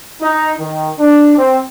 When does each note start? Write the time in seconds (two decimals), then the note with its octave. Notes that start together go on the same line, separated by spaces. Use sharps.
0.22 D#4
0.60 D#3
1.00 D4
1.37 C4